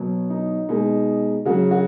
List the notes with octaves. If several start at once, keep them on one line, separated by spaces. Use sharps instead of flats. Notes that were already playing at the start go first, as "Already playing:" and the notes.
Already playing: B2 F#3
D#4
B2 G#3 D#4
C#3 F#3 F#4
F#4